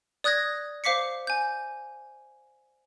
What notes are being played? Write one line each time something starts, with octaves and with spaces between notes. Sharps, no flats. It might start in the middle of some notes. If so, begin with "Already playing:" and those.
D5 D#6 F#6 G#6 A#6
C5 F5 D6 B6 C#7
G#5 G6